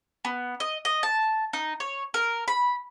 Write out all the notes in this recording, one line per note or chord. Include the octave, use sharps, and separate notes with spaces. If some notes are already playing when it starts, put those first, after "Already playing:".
B3
D#5
D#5
A5
D#4
C#5
A#4
B5